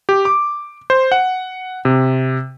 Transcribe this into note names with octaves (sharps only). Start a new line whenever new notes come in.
G4
D6
C5
F#5
C3